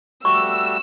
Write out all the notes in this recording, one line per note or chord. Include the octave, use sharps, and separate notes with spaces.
G3 A3 F#4 C#6 E6